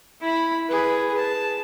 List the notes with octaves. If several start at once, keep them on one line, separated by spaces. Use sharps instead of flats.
E4 B5
G#4 B4
A5